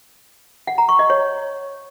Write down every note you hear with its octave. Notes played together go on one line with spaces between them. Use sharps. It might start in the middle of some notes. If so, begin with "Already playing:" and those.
F#5
A#5
C#6
D#5
C#5